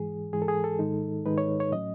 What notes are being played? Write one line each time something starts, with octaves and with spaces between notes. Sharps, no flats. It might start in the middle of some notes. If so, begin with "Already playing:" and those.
Already playing: G#2 E3 G#3 G#4
G#2 E3 G#3 G#4
A4
G#4
A4
G#2 D#3 G#3 D#4
G#2 D#3 G#3 D#4 B4
C#5
C#5
A2 F#3 C#4 D#5